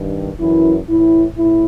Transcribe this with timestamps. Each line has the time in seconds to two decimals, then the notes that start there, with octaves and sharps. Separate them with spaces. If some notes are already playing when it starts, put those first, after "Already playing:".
Already playing: G2 D#3
0.39 F#2 E3 E4
0.88 A2 E3 E4
1.37 A2 E4